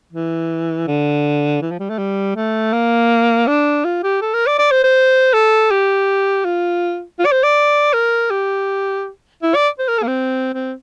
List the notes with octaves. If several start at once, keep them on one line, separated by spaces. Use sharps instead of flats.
E3
D3
E3
F3
G3
A3
G3
A3
A#3
D4
F4
G4
A4
A#4
D5
D5
C5
C5
A4
G4
F4
F4
D5
C5
D5
A#4
G4
E4
D5
C5
A#4
A4
A#3
C4
C4